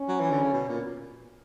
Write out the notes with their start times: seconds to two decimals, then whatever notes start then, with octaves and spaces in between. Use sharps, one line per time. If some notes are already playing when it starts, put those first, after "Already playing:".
Already playing: C#4
0.08 F#3
0.20 E3
0.31 D3
0.42 C#3
0.53 B2
0.69 A#2